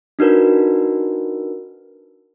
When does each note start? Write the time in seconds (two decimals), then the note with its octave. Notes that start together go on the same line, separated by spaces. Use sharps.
0.19 D4 D#4 F#4 A#4 B4